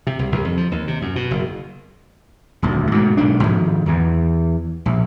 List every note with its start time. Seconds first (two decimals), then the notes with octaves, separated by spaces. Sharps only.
0.07 C3
0.19 C2
0.32 C2
0.45 F2
0.57 F3
0.72 D#2
0.88 C3
1.02 F#2
1.16 B2
1.31 F#1
2.62 D#1 D2
2.92 G#2 B2 D3
3.17 B1 G#2 D4
3.43 G#2 D#3 F3
3.86 E2 E3
4.86 A#1